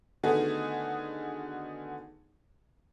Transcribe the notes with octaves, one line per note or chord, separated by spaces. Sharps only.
D3 D#3 A3 B3 F#4 G#4